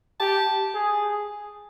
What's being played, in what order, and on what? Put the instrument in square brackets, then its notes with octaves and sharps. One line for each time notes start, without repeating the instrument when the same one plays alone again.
[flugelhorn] G4 [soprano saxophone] A5
[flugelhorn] G#4